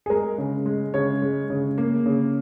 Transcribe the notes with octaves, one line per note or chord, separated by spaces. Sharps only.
G#4
G#3 A#4
C#3
G#3
C#3 C#5
G#3
C#3
A#3
C#3